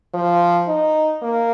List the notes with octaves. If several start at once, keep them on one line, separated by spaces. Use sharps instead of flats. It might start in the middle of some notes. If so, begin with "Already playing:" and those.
F3
D#4
A#3